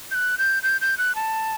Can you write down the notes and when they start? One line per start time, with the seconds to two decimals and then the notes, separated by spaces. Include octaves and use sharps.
0.11 G6
0.15 F#6
0.38 G6
0.63 G6
0.81 G6
0.98 F#6
1.15 A5